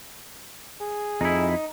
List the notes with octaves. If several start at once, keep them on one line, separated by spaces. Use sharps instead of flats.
G#4
F2 D#4 E4